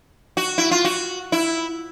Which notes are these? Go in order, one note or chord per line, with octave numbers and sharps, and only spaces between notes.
F#4
E4
F4
F#4
E4